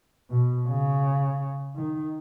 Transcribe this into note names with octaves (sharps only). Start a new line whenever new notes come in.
B2
C#3
D#3